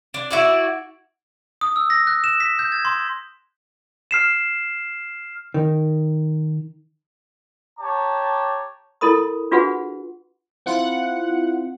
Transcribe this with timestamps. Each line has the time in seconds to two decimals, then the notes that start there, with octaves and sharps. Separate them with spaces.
0.14 D4
0.31 E4 F#4 D5
1.61 D#6
1.76 E6
1.90 A#6
2.07 F#6
2.24 E7
2.40 B6
2.59 G6
2.72 G#6
2.85 C6
4.11 F6 C7 E7
5.54 D#3
7.79 G4 C#5 A5 A#5 D6
9.01 E4 A4 A#4 B5 D#6
9.51 D4 F4 F#4 G#4 B4 F#5
10.66 C4 E4 F4 F#5